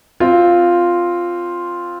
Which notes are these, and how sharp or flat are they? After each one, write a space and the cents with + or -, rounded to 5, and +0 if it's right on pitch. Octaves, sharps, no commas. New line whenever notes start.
C4 +0 F4 +0